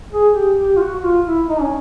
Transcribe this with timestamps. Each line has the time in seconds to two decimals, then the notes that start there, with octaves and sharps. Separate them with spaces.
0.12 G#4
0.35 G4
0.58 G4
0.76 F4
0.81 F#4
0.95 F#4
1.04 F4
1.26 E4
1.49 D#4
1.61 C#4